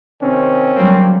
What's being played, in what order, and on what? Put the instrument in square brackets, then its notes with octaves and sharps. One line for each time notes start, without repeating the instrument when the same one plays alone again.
[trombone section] C3 D#3 C4 [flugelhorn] C#4
[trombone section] D3 A#3 C4 [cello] F#3 G3